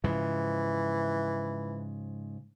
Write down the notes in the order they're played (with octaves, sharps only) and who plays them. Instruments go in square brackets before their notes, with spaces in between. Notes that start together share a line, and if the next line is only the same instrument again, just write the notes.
[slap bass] G#2 C#3 F3 [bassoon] E3